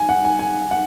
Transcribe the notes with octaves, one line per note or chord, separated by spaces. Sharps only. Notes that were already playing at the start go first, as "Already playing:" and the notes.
Already playing: G#5
F#5
G#5
G#5
F#5